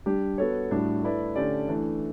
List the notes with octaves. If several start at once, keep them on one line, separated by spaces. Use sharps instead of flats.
G3 D4 G4
B3 F#4 A4 C#5
A2 G3 D4 F#4
A3 E4 B4 D5
D3 A3 C#4 G4 D5
E3 A3 D4